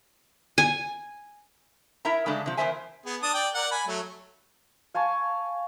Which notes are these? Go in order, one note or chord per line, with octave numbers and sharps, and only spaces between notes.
G#5
E4 A#4 E5 A#5
C#3 G#3 A3 D4
C3 F3
E2 C4 A#4 C5 E5 G#5
B3 G#4
D4 A5 D#6
D5 G5
A#4 D5 F#5
G#5 B5
F#3 A3
F5 G#5 A5 C#6